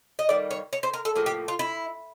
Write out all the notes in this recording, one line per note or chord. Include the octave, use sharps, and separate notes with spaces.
D#5
D#3 G3 A#3 D5
C#5
C#5
C5
A#4
A4
A2 F3 A#3 G#4
G4
F4
E4